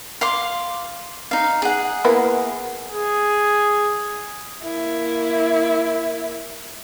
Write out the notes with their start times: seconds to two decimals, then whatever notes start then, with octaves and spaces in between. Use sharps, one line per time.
0.21 F5 C6 D6
1.31 D#4 F5
1.62 G#4 F#5
2.05 A#3 B3 E4
2.87 G#4
4.63 A#3 E4